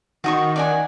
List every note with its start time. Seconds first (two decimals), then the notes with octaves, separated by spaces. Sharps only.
0.24 D#3 F#4 D#5 C#6
0.56 D5 F#5 G#5